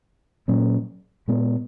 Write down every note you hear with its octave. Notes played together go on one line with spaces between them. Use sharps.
A#2 F#3 A#3 C#4
A#2 G#3 B3